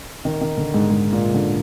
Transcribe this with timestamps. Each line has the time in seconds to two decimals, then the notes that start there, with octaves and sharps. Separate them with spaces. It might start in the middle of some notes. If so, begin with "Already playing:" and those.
0.25 D#3
0.41 D#3
0.57 D3
0.74 G#2
0.90 G#2
1.12 A#2
1.34 D3